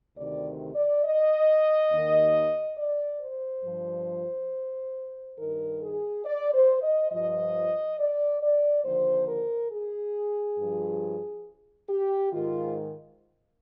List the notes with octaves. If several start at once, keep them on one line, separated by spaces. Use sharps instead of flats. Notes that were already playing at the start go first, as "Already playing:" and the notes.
D2 C3 D#3 D5
D5
D#5
D#2 D#3
D5
C5
G2 F3
G2 D#3 A#4
G#4
D5
C5
D#5
G2 F3 D#5
D5
D5
D#2 D3 F3 C5
A#4
G#4
G2 F3
G4
G#2 D#3 F4